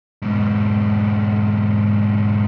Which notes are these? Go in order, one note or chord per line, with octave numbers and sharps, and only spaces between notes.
G#2 B2